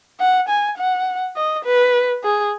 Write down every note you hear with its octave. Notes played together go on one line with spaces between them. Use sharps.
F#5
G#5
F#5
D#5
B4
G#4